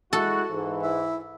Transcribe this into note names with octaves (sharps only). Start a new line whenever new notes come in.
G#3 E4 F#4 A4
G#2 E3
E4